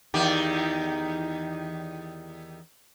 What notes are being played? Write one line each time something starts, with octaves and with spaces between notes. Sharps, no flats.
E2 D#3 G4